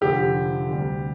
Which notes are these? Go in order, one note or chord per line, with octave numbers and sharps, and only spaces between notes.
F1 F2 D3 F3 G4
D2 C3 G3